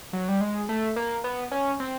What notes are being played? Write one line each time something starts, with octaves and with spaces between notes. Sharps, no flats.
F#3
G3
G#3
A3
A#3
B3
C#4
C4